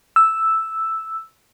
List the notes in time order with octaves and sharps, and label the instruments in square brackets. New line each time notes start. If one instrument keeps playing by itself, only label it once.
[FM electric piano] E6